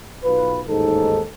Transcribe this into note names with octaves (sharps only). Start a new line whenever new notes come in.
B1 F4 B4
A1 D#2 G#2 D#4 A4